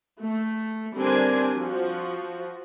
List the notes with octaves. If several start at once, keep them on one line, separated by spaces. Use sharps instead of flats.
A3
D3 G3 C4 D4 A#4 G#5
F3 F#4